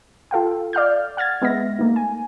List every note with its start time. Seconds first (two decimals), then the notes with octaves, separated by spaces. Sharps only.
0.31 F4 A4 F5 G5
0.73 D5 F5 F6 G6
1.17 F#5 F6 G#6 A6
1.42 G#3 B3 E5 A#6
1.79 A3 A#3 D#4
1.96 G#5